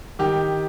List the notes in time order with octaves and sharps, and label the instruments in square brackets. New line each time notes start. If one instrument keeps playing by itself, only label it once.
[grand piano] D#3 G4